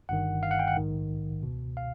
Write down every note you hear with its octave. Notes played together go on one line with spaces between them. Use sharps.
G1 G2 D#3 F#5
F5
F#5
G5
F#5
A#1 G#2 D#3
C#2 B2
F5